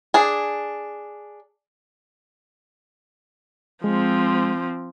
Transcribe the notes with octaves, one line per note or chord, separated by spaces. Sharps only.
D4 G#4
F3 G#3 C4